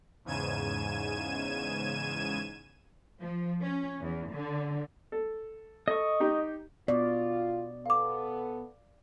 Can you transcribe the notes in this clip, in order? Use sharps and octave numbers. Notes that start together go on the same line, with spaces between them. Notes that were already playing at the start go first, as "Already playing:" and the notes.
E2 G#2 C#3 G#6 D#7 E7
F3
C#4
E2
D3
A4
A4 D#5 C#6
D#4 G4
B2 F4 D5
B3 A4 F5 D6